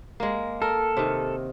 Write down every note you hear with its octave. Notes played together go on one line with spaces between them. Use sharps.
G#3 A#3
A4 A#4
C3 D#3